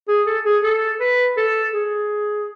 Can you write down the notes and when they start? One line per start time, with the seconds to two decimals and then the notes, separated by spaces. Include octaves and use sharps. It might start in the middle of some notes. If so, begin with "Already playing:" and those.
0.08 G#4
0.27 A4
0.45 G#4
0.63 A4
1.00 B4
1.37 A4
1.74 G#4